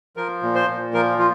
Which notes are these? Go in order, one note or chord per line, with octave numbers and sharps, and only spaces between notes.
F3 A#4
A#2
C5
A#2
F3 A#4
F3 F4